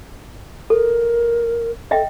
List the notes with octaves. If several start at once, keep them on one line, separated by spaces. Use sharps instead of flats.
A4 A#4
A4 D#5 E5 G5